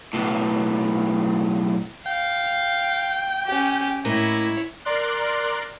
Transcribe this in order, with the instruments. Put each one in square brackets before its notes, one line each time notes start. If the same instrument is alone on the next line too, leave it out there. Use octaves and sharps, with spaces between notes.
[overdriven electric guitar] B1 A2
[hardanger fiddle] F5 [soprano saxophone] G5
[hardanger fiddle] C#4 G4
[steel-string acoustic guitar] A2 A#3 D#5 [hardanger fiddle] E4 C#5
[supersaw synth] A#4 D5 C6 F#6